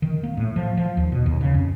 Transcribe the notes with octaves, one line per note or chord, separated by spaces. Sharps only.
D#3
A#3
A2
F3
F3
D#2
B2
D#2
C#3
F2